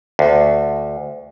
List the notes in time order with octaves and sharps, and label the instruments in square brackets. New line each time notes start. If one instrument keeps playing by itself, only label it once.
[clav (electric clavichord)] D2